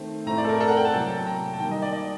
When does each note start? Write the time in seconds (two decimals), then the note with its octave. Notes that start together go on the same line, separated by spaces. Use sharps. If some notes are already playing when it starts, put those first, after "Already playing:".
Already playing: D#3 A3 C4
0.26 A2 A3 C4 A#5
0.38 D5
0.45 A4
0.49 A#4
0.60 A4
0.68 F#5
0.77 G5
0.85 A5
0.93 C3 F#3 A#3 G5
1.10 G5
1.27 A#5
1.53 A5
1.60 D#3 G3 A#3 G5
1.71 D#5
1.82 D5
1.93 D5